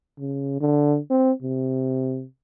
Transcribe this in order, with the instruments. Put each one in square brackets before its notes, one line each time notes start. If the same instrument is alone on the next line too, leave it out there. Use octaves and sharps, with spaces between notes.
[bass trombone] C#3
D3
C4
C3